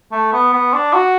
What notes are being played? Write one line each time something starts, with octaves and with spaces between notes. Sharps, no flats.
A3
B3
B3
D4
F#4